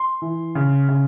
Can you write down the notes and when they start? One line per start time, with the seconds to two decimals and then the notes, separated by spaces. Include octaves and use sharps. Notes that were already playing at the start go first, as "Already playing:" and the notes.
Already playing: C6
0.22 E3
0.55 C#3
0.89 C#3